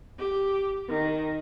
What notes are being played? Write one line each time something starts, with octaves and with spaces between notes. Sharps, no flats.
G4
D#3